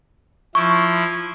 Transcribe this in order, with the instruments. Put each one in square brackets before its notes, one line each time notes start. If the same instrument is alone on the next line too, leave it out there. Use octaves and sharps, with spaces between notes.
[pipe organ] F3 E4 [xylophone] C#6